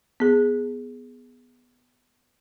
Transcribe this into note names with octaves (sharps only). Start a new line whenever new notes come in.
B3 G#4